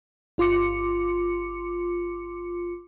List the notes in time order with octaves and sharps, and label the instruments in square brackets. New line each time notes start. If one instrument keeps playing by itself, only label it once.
[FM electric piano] G1 F4 C6 D6 C#7